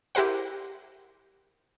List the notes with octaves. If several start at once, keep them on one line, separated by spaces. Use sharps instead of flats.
E4 G4 A#4 C5 F#5